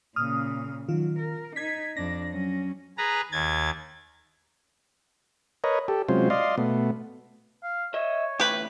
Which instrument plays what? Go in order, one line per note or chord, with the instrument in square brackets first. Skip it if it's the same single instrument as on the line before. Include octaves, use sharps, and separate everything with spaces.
[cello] A#2 C#3 [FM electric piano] D#6 F6
[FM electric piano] D#3 F4 [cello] F#3
[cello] A#4
[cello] D#4 [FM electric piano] G#6 B6
[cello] F2 D4 [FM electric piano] A#6
[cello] F#3 C#4
[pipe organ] G#4 B4 A#5
D#2 G#6 A6
[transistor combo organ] A#4 B4 C#5 D#5
G4 A4
C3 F#3 G#3 C#4 F4 C5
D5 D#5 F5 C6
B2 A3 B3
[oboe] F5
[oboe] C#5 [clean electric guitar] D#5 E5
[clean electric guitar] D3 E3 A3 [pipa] G4 B4